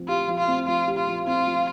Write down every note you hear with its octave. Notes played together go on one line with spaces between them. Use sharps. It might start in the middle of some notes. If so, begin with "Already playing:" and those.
Already playing: F3 C4
F4 G4
F3
F4
C4
F3 F4
G4
F4
F3
C4 F4
F3